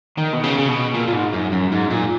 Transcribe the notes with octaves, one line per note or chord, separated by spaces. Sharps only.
D#3
B2
C#3
C#3
B2
A#2
A#2
G#2
F#2
F#2
G#2
A#2